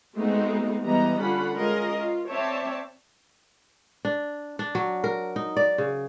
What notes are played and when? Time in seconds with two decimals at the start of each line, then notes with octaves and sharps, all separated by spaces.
0.15 G#3 A3 B3 C4 D#4 F#4
0.83 E3 G3 B3 D#5 A#5
1.21 D3 C#4 F4 F#5 B5
1.55 G#3 C#4 F4 G#4 A#4 D#5
1.99 F4
2.29 C4 C#5 D5 E5 G5 A5
4.05 D4
4.59 D4
4.75 F#3
5.04 A#4
5.36 D#4
5.57 D5
5.78 C#3